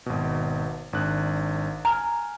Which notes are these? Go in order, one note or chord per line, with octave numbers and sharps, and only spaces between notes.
G#1 B2
G#1 D4 F#6
G#5 A#5 F6